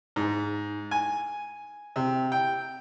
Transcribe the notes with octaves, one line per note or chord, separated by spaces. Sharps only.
G#2
G#5
C3
G5